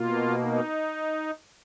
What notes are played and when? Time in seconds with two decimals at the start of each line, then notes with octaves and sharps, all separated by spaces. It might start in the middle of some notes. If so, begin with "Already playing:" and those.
Already playing: B2 A#3 F4
0.40 D#4